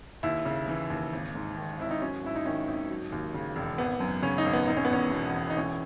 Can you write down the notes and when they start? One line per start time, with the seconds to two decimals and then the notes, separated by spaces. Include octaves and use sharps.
0.23 D#2 E4
0.46 C#3
0.68 E3
0.90 D#2
1.13 G#1
1.35 G#2
1.56 D#3
1.79 G#1 E4
1.91 D#4
2.01 F#3 C#4
2.23 G#2 E4
2.36 D#4
2.45 D#3 C#4
2.68 G#1
2.90 F#3
3.12 D#2
3.34 C#3
3.56 E1
3.78 G#1 B3
4.00 F#2
4.23 C#3 C#4
4.38 D#4
4.46 G#1
4.53 B3
4.67 E1 D#4
4.77 C#4
4.85 B3
4.90 E2 C#4
5.11 B2
5.34 E1
5.50 D#4
5.57 E3 C#4